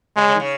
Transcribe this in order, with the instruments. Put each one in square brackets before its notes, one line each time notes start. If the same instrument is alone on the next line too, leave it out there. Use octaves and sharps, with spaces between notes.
[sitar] C#3 [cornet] G#3
[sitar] C#3
D#3
C#3